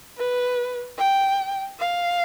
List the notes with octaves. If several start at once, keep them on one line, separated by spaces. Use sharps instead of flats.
B4
G5
F5